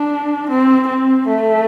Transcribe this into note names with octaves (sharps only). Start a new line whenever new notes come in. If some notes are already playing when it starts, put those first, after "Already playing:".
Already playing: D4
C4
C4
A3